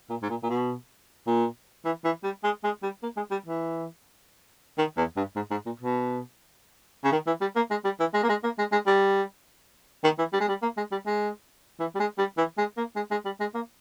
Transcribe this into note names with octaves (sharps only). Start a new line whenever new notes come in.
A#2
G#2
A#2
A#2
B2
A#2
E3
E3
G3
G#3
G#3
G3
A#3
G#3
G3
E3
D#3
E2
G2
G#2
G#2
A#2
B2
C#3
D#3
E3
G3
A#3
G#3
G3
E3
G#3
A#3
G#3
A#3
G#3
G#3
G3
D#3
E3
G3
G#3
G3
A#3
G#3
G3
G#3
E3
G3
G#3
G3
E3
G#3
A#3
G#3
G#3
G3
G#3
A#3